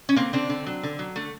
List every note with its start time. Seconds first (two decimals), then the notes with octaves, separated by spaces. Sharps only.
0.09 C#4
0.16 D3 A#3 C4
0.33 D3 C4 D4
0.49 D3
0.67 F#3
0.83 D3
0.99 F#3
1.16 D3 A3